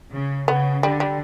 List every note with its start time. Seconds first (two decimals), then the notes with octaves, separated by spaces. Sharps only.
0.13 C#3
0.48 C#3 B3
0.83 D3 G3
1.00 G3